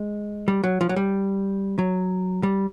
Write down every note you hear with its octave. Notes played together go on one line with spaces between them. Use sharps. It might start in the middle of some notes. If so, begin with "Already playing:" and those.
Already playing: G#3
G3
F#3
F3
F#3
G3
F#3
G3